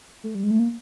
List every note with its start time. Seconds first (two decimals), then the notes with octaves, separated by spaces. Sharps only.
0.24 A3
0.35 G3
0.43 G#3
0.51 A3
0.59 A#3